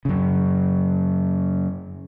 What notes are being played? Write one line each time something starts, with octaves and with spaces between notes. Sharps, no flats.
F#2 C#3